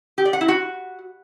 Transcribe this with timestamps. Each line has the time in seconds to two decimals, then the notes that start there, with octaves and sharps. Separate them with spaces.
0.18 G4
0.25 D5
0.33 F#5
0.41 E4
0.48 F#4